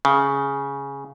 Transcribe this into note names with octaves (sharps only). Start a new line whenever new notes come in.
C#3